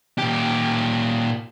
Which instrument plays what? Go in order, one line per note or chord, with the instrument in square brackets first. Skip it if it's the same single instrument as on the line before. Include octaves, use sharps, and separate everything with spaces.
[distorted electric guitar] A#2 G4